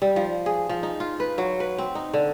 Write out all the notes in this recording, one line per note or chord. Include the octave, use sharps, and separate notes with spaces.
G3
F3
G#4
F3
D#4
F4
B4
F#3
B4
C4
D#4
D3